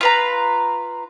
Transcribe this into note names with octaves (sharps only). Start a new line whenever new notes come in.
F4 B4 A#5